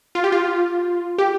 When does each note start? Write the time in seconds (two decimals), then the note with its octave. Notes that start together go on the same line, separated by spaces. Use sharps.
0.15 F4
0.24 G4
0.32 F4
1.18 G4